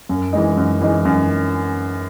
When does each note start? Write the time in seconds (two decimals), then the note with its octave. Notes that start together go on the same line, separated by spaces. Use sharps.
0.09 F#2
0.33 E3 G#3 D#4
0.57 F#2
0.81 E3 G#3 D#4
1.05 F#2